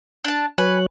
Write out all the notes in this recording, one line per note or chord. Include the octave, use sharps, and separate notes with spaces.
D4 A5
F#3 B4 C#5 G#5 F#6